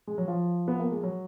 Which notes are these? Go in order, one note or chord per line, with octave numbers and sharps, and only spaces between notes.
G#3
F#3
F3
B3
A#3
G#3
F#3